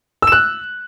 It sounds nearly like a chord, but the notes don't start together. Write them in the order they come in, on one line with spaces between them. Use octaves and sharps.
E6 E7 F#6